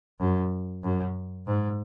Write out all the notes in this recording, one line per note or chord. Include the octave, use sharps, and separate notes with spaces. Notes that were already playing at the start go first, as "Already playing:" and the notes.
F#2
F#2
G#2